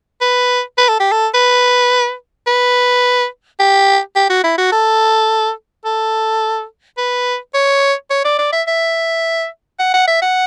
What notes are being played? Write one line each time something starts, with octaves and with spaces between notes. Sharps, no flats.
B4
B4
A4
G4
A4
B4
B4
G4
G4
F#4
E4
F#4
A4
A4
B4
C#5
C#5
D5
D5
E5
E5
F#5
F#5
E5
F#5